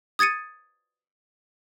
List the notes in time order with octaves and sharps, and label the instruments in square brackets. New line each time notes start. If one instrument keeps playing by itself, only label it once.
[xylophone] D#6 G#6 A6 C#7 D#7